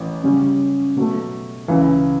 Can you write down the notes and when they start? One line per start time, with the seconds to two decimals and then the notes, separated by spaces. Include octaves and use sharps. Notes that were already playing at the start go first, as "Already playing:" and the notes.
Already playing: A1 E3
0.23 C#3 G3 C#4
0.96 B2 F#3 A3
1.68 C#2 C#3 E3